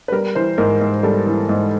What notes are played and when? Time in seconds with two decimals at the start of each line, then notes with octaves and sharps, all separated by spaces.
0.08 B4
0.12 G3 A#4
0.35 E3 C5
0.58 G#2 A#4
0.81 G#2
1.03 G3 A4
1.26 E3
1.49 G#2